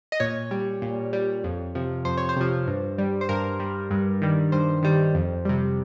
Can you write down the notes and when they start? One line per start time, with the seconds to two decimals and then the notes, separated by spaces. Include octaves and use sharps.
0.12 D#5
0.20 A#2 C#5
0.51 G3
0.82 A#2
1.13 G3
1.44 F2
1.75 C3 F3
2.05 F2 C5
2.18 C#5
2.29 C5
2.36 C3 F3
2.67 G2
2.98 G3
3.21 C5
3.29 G2 A#4
3.60 G3
3.91 G2
4.22 D#3 G3
4.52 G2 C5
4.83 D#3 G3
5.14 F2
5.45 C3 G3